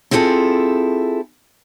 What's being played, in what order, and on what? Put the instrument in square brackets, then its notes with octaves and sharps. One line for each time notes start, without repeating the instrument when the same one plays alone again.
[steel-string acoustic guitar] C4 E4 F4 G#4 A4